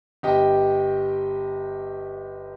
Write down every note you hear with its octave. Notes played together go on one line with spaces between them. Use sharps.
G1 G4 D#5 G5